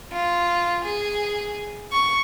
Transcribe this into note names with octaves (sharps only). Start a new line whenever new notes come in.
F4
G#4
C#6